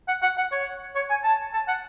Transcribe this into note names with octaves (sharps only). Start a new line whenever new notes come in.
F#5
F#5
F#5
C#5
C#5
G#5
A5
A5
F#5